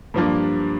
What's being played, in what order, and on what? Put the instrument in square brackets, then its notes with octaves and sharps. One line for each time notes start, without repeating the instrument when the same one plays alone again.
[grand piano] G2 F3 A#3 D4 F4